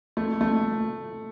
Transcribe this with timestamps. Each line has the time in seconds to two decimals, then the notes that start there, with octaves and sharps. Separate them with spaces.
0.17 A3
0.41 A3